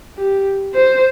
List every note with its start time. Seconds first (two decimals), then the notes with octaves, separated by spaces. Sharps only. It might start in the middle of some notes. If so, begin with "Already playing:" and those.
0.18 G4
0.75 C5